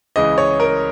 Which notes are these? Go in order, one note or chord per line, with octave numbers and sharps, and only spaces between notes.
C#2 C#3 E3 D#5
C#5
A#4